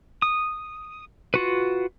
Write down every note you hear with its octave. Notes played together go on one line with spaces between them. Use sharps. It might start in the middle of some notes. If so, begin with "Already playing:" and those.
D#6
F4 F#4 B4